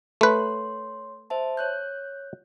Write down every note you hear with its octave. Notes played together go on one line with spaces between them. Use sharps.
A3 B4 C#5 C6
C5 E5 A5
C#5 F#6 G6